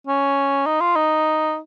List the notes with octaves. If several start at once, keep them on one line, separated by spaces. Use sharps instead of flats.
C#4
D#4
F4
D#4